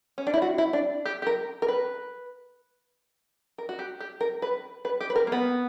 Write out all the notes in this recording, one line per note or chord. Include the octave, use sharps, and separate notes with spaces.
C#4
D4
E4
F#4
E4
D4
G4
G4
A#4
A#4
B4
A#4
F#4
G4
G4
A#4
B4
B4
G4
B4
A#4
A#3
B3